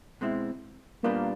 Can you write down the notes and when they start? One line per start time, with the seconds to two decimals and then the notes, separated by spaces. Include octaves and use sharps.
0.21 B2 G#3 C4 E4
1.03 A#2 G3 A#3 B3 D4 F4